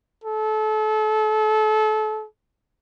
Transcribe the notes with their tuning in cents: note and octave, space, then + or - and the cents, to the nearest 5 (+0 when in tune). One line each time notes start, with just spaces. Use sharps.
A4 -30